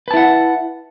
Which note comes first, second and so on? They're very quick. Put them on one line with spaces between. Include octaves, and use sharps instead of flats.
B4 A5 E4 F#5